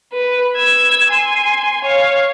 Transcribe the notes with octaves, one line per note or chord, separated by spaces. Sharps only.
B4
E6 G#6
G#5 C6
C#5 F5